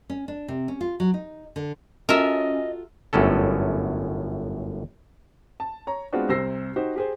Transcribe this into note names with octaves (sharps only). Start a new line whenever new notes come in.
C#4
D4
C3
C#4
F4
F#3
D#4
D3
C#4 F4 F#4 A4 A#4 D#5 E5
G1 F#2 A2 C#4 A4
A5
C#5 A#5
G#3 B3 C4 D4 F4 F#4
C2 C3 C5 E6 A#6 C7
D#4 F#4 G4 C5
G4 G#4 C5